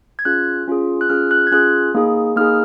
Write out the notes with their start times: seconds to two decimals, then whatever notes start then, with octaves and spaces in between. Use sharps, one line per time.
0.19 G#6
0.25 C#4 F4 G#4 F#6
0.67 C#4 F4 G#4
1.01 F#6
1.10 C#4 F4 G#4 F6
1.31 F#6
1.47 G#6
1.52 C#4 F4 G#4 F#6
1.94 A#3 D#4 G#4
2.36 A#3 D#4 G#4 F6